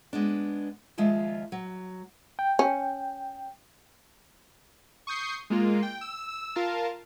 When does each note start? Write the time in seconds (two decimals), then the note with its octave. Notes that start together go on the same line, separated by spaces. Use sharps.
0.13 G#3 B3 D4
0.98 D#2 F3 G#3 F4 E5 F5
1.52 F#3
2.39 G5
2.59 C#4
5.07 C#6 D#6 G6 C7
5.50 G#3 A#3 F4
5.83 G5
6.01 E6
6.55 F4 A#4 F5 A5